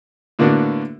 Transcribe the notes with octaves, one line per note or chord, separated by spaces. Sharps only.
A2 D3 A#3 B3 D4 F#4